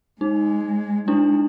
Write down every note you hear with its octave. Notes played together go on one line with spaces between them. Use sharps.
G#3 D#4
G#3 D4 E4